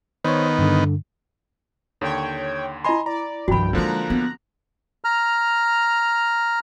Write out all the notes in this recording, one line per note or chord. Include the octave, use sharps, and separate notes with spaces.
D#3 B3 C5 C#5
G2 D3
D#2 D3 C#5 G5 G#6
E4 D#5 G#5 B5 C6
D5 A#5
C2 G2 D#3 F3 F#4 G5 B5
D3 F3 G#3 A#3 D#4 A#5 F#6
B3
A#5 F6